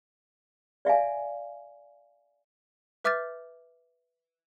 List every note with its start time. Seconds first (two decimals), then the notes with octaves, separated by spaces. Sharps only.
0.85 D5 E5 F5 G#5
3.05 B4 E5 D6 F6 G6 A6